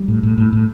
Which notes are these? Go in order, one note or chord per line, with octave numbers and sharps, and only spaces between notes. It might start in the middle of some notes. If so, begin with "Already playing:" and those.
Already playing: G3
A2
A2
A2
A2